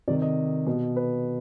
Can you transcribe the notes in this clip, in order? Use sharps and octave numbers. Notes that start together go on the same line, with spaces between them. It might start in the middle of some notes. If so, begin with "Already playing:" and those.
C3 D#3 D5
D#5
B2
B4